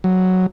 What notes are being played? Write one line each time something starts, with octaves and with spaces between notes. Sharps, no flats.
F#3